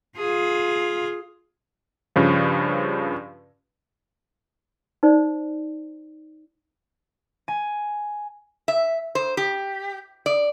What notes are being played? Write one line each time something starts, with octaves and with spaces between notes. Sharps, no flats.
F4 G#4
G2 C#3 F3
D#4 C5 D5
G#5
E5
C5
G4
D5